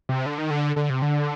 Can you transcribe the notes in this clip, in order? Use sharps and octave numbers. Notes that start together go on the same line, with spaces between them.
C3
D3
D#3
D3
D3
C3
D3